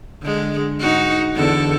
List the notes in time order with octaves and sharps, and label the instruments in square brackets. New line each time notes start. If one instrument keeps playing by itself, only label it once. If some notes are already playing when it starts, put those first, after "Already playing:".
[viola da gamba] D3 G#3
G#2 D#4 F#4
E2 D3 A4